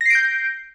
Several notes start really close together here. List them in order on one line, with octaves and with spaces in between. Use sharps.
A#6 C7 D7 G6